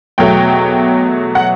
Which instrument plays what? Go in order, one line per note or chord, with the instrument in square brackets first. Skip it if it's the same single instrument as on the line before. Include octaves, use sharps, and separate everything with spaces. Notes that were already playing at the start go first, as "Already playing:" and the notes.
[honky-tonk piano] E2 B2 F#3 A3 G5
F#5